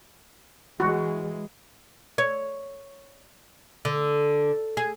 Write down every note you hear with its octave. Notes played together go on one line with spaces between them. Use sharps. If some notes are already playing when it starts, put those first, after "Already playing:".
E3 G#3 F#4
C#5
D3
G#4